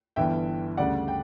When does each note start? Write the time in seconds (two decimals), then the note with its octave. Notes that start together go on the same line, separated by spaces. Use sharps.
0.16 G1 G2 E3 E5 G5
0.77 D2 C#3 G3 D5 F#5
1.08 G5